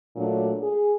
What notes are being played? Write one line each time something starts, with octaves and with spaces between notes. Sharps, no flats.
A#2 F#3 A3 D4
G#4